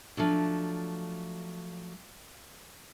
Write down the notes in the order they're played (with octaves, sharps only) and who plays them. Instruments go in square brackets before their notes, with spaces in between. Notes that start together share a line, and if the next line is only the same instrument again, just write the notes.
[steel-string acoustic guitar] F3 F#3 A3 D4